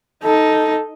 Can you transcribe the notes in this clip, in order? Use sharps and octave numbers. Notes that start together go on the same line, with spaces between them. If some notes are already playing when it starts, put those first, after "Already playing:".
D#4 A4